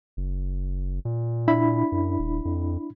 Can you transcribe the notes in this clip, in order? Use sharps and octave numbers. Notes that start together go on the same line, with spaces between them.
F#1
A#2
D4 E4 B5
F#2
D#1
F2